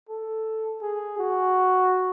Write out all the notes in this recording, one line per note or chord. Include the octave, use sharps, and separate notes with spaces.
A4
G#4
F#4